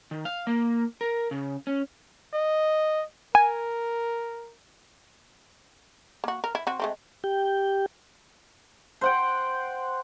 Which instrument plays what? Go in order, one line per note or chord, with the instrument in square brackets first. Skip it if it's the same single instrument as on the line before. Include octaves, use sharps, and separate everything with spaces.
[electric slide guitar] D#3
F5
A#3
A#4
C#3
C#4
[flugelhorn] D#5
[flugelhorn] A#4 [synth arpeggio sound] G#5
[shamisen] A#3 F#4
A#4
E4
C4 F#4
G#3 A3 C4
[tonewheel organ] G4 G5
[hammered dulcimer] C5 F#5 G5